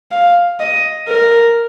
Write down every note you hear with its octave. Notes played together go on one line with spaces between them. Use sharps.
F5
D#5
A#4